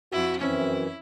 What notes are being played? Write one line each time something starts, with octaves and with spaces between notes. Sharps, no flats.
F2 E4 F#4
F#2 E3 C4 C#4 E4